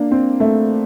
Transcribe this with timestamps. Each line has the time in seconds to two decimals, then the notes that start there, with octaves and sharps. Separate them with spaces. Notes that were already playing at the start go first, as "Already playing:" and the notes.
Already playing: A#3 D4
0.11 C4
0.40 A3